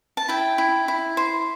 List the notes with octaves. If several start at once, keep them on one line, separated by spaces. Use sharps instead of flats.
A5
E4 E5 G5
E4
E4
C5